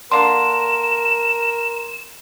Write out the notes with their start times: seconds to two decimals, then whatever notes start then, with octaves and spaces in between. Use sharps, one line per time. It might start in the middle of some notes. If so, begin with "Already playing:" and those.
0.12 D3 A#3 D4 A#4 C6 E7